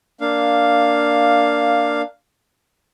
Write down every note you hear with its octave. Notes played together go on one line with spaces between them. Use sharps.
A#3 D4 F5